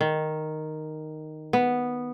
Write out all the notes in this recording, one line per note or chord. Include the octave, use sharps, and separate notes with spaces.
D#3
B3